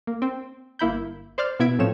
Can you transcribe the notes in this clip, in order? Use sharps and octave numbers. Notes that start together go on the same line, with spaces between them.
A#3
C4
G1 A#3 E4 B5 G6
C5 D5 D6 F6 A6
B2 B3 E4 G#6 B6 D7
A2 F3 C4 C#5 E7